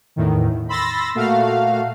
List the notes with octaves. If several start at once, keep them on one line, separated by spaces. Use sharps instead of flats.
E2 A2 D#3
B5 C6 E6 A6 A#6
A#2 A3 F#4 F5